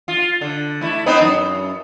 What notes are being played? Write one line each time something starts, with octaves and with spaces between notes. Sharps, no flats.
F4
D3
A3 E4
B3 C4 D#4
F#2